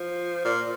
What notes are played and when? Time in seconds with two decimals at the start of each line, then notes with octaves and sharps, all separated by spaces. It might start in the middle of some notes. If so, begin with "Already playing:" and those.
Already playing: F3
0.45 A#2